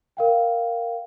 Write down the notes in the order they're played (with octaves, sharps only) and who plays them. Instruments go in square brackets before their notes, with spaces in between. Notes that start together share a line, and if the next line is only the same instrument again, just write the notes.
[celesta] A#4 F5 G5